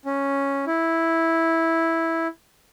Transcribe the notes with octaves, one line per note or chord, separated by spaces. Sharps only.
C#4
E4